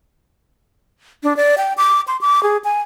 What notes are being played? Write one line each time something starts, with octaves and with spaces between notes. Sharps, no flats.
D4
D5
G5
D6
C6
D6
G#4
G#5